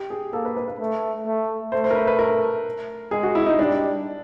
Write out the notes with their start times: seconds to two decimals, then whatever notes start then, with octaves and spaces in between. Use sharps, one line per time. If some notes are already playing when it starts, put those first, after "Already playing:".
Already playing: G4
0.10 G#4
0.33 A#3 A4
0.45 B4
0.57 B4
0.68 B4
0.80 A3
1.26 A3
1.72 A3 C5
1.84 C5
1.91 A#4
1.95 B4
2.07 B4
2.19 A#4
3.11 G#3 G#4
3.23 F#4
3.35 E4
3.46 D#4
3.58 G3 D4